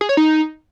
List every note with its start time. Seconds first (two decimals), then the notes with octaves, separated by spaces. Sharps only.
0.01 G#4
0.09 C#5
0.17 D#4